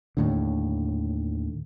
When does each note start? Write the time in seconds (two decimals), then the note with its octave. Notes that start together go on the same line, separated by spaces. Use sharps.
0.17 D#2 A2 D3